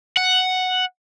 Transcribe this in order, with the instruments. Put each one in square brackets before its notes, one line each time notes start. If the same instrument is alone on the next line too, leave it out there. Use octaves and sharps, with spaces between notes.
[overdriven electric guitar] F#5